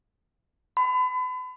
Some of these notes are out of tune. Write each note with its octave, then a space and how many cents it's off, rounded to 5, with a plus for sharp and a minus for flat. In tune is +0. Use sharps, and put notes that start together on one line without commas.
B5 +35